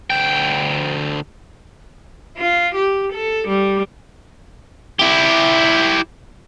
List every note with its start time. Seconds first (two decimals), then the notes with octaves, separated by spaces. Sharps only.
0.10 D2 G5
2.37 F4
2.75 G4
3.13 A4
3.48 G3
4.99 E4 G4